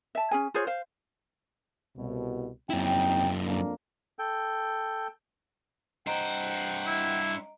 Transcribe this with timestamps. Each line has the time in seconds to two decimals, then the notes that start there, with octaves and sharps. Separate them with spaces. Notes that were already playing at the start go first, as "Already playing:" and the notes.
0.15 E5 A5
0.31 C#4 G#4 G#5
0.54 F4 G#4 C5 C#5
0.67 C5 F5
1.97 C2 B2
2.70 F#2 C4 D#4 E4 G5
3.46 F2 A#3 D4
4.19 A4 G5
6.07 G2 C5 D#5 F#5 G5 A#5 D7
6.87 E4